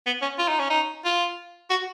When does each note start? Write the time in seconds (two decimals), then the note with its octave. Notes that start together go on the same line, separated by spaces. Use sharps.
0.06 B3
0.22 C#4
0.39 F4
0.48 D#4
0.59 C#4
0.70 D#4
1.05 F4
1.70 F#4